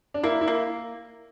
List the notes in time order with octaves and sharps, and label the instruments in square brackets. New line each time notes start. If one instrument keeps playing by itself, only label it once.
[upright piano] D4
[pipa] A#3 [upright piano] E4
[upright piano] E4
[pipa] A#3